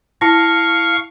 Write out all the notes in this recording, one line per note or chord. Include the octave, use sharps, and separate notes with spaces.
E4 F5 A5 C#6 A#6